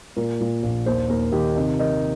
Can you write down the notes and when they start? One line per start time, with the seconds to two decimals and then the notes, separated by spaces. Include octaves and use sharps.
0.16 A#2 A#4
0.40 A#2
0.63 A#1
0.86 D#2 C5
1.09 D#2 A#4
1.32 D#3 G4
1.56 C3 D#4
1.79 D#3 D#4